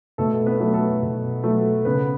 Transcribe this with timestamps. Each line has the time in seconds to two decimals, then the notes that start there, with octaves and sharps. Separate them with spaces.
0.18 B2 A3 A4
0.46 B3 B4
0.60 F#3 A3
0.73 A3 A4
1.02 B2
1.44 F#3 A3
1.85 C#3 B3 B4